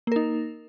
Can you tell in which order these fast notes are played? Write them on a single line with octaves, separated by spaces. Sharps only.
A#3 A#4 D#4